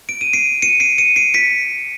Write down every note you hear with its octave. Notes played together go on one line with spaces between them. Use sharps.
D7
D#7
C7 D7
C#7 D#7
C7 D7
C#7 D#7
C7 D7
B6 C#7